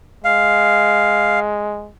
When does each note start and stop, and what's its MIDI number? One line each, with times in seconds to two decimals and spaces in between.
0.24 1.90 56
0.24 1.40 77